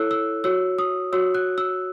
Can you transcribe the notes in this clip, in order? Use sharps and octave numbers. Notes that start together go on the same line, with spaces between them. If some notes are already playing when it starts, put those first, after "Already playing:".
Already playing: E4 A4 C#5 E6 F#6
E6
F#4 C#5 E6
D#6
F#4 C#5 E6
F#6
E6